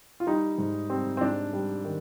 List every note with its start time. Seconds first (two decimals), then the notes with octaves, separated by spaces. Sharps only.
0.20 F4
0.27 G3 D#4
0.58 G#2
0.90 G3 C4
1.17 C4
1.21 G#2 D4
1.53 G3
1.85 D#3